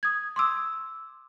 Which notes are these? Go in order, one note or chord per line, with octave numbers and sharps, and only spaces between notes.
D#6 G#6
C6 D6 E6